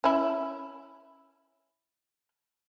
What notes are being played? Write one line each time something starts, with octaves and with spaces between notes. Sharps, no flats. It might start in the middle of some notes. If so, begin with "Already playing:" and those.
C#4 E4